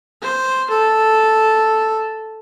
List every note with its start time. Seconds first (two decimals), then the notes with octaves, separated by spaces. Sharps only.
0.22 C5
0.70 A4